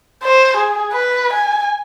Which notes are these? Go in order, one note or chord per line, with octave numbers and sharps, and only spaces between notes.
C5
G#4
B4
G#5